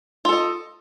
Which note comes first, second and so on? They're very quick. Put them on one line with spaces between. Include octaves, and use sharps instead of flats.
F4 A4 D#5